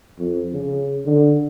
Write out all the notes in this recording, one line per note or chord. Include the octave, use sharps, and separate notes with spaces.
F2
C#3
D3